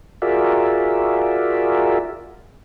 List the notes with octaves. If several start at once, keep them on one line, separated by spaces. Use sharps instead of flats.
F4 F#4 G#4 A#4 D5 E5